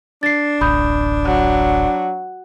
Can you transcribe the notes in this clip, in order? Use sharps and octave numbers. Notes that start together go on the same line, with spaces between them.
D4 A6 C7
D1 A1 B5 D#6 G6
F#3